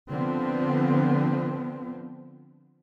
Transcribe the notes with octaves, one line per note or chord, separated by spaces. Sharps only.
D3 F3 B3 C4